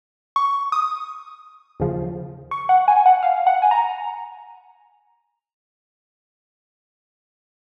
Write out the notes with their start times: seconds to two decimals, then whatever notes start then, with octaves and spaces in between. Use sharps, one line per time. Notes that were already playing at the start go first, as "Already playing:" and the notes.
0.36 C#6
0.72 D#6
1.80 D#2 C#3 F3
2.51 C#6
2.69 F#5
2.88 G#5
3.06 F#5
3.23 F5
3.47 F#5
3.62 G#5
3.71 A#5